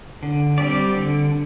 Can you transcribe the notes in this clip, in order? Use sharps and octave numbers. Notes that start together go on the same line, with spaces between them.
D3
G3 C4 G4 D5
D3